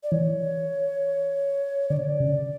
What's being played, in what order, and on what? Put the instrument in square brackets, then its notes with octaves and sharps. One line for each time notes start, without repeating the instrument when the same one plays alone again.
[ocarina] D5
[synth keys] E3 [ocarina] C#5
[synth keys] D3 [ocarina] D5
[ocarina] C#5
D5
[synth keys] C#3